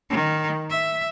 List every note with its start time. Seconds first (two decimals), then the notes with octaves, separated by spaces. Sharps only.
0.10 D#3
0.70 E5